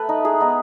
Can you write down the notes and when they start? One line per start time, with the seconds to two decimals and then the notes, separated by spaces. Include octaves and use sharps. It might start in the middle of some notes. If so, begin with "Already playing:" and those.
Already playing: A3 B4
0.09 D#4
0.25 G#3 G#4
0.40 B3 D#4